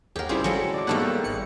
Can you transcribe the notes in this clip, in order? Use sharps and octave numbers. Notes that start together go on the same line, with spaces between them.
D#2 G4 G#4 A#4 F#5
A1 C#3 G3 C4 E4 F4 G#4 B5
F#3 G#3 G#4 A4
D5 D6
B1 G#2 G3 A3 A#3 A4 B4 F#5
G#1 F#6 C#7